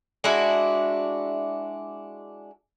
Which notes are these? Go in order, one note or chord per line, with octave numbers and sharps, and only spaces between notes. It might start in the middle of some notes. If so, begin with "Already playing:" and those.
G#3 D4 E4 F#4